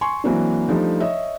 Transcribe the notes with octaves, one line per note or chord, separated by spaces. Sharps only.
G#5 C6 C#6
E3 F#3 A#3 C4 D4
F3 G3 A3 D4 D#4
C#5 D#5 E5